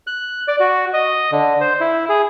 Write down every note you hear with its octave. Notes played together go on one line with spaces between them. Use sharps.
F#6
D5
F#4
D#5
D3
C5
E4
G#4